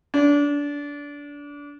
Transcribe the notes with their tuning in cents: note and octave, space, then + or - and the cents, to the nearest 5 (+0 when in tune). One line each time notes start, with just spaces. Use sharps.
D4 -25